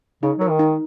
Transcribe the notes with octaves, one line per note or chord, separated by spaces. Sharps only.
C#3 D#4
F#3 A#4
D#3
D#4